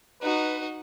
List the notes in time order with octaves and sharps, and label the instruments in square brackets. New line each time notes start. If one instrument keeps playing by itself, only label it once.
[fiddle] D#4 F#4 [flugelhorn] B4